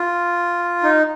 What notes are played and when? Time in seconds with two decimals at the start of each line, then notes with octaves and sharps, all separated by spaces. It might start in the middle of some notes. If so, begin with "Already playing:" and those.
Already playing: F4
0.83 D#4